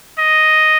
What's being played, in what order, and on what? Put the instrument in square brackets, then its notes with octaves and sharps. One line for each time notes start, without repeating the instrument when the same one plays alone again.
[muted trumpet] D#5